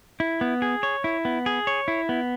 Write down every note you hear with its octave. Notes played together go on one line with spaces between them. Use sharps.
E4
B3
G#4
C#5
E4
B3
G#4
C#5
E4
B3